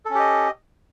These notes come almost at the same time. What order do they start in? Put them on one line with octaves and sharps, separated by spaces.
A4 C#4 G4 D#5